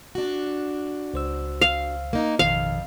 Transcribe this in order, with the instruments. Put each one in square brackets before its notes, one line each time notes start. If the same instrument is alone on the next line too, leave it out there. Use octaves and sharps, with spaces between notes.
[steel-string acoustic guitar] D4 F#4
[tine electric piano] C#2 C5 E6
[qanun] F5
[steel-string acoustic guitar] A#3 D#4
[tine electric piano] A1 B2 D#3 [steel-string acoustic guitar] F2 [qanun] F5